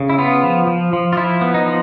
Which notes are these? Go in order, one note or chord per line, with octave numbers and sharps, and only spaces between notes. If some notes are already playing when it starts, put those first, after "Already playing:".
Already playing: C#3
E4
B3 F4
F3
F3
F3
F4
F3 E4
B3
D#4
F3